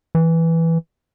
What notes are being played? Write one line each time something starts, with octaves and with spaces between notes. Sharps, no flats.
E3